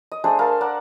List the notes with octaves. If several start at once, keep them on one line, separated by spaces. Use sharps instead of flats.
D#5
A3 D4 G#4 C5
A4 A#4 F5 A5
A#4 D5 F#5